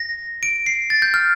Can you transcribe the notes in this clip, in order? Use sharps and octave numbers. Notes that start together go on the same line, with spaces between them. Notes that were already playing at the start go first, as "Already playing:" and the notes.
Already playing: A#6
D7
C7
A6
G6
F6